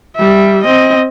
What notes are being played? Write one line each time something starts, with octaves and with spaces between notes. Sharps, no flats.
G3 E5
C4 D#5